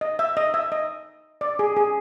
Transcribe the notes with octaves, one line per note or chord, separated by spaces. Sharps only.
D#5
E5
D#5
E5
D#5
D5
G#4
G#4